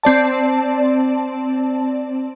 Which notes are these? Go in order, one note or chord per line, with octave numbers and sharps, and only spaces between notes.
C4 D5 A5